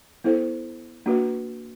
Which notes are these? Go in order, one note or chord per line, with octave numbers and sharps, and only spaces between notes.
B3 E4 A4 C5
A#3 D4 F#4 B4